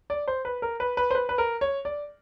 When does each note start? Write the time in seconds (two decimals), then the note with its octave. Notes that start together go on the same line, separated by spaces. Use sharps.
0.10 D5
0.28 C5
0.45 B4
0.62 A#4
0.80 B4
0.97 B4
1.11 C5
1.15 B4
1.29 B4
1.38 A#4
1.61 C#5
1.85 D5